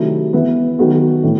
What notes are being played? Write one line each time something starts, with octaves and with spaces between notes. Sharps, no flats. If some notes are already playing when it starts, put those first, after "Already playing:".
Already playing: C3 D#3 F#3 A3 E4
E3 B3 E4 B4
D#3 F#3 B3 F#4 A4
A2 E3 A3